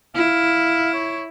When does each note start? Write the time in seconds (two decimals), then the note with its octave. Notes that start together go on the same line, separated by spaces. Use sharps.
0.16 E4 F5
0.94 C#5